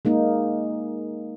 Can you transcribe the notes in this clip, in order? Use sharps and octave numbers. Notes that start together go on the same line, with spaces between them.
G#3 A#3 D#4